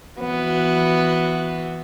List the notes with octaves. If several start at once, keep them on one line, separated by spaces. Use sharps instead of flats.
E3 B3 F#4